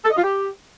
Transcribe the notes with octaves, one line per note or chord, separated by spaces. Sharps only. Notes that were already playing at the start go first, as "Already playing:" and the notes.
A4
D#5
F4
G4